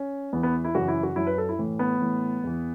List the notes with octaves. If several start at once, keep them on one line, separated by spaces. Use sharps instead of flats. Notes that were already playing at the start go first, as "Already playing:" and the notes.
Already playing: C#4
E2 E3 B3
B3
E4
F#2 C#3 E3 F#4
E4
F#4
F#2 F#3 E4
B4
A4
E4
A2 E3
B3
A2 E3
E2 E3